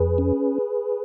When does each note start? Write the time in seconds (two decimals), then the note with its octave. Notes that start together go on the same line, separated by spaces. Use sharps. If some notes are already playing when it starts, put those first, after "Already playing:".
Already playing: F2 G#4 B4
0.18 C#4